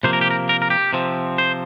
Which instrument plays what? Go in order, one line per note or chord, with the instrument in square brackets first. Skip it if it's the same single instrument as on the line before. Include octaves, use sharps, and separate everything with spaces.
[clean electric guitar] C3 F3 A#3 C5
A#4
G4
A#4
A#4
A#4
G4
C3 F3 C4
C5